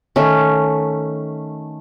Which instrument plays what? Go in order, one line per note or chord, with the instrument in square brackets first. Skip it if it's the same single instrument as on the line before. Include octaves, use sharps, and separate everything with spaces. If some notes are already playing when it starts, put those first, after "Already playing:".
[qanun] D#3 A3 C#4